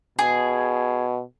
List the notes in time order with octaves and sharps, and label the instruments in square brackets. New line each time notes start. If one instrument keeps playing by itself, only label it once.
[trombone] B2 [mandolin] G#4